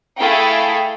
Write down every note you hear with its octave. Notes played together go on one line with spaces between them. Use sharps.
A3 E4 G#4 A4 F5 G5